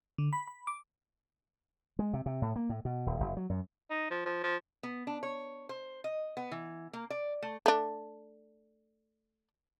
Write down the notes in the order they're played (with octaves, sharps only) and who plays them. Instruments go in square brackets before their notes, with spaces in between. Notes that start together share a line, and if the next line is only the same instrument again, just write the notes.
[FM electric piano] D3
B5
B5
D6
[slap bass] G#3
C3
C3
A2
A#3
A2
B2
D#1
F#1
F#3
F#2
[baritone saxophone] D#4
F3
F3
F3
[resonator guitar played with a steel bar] B3
D4
C#5
C5
D#5
B3
E3
A#3
D5
A3
[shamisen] A3 D4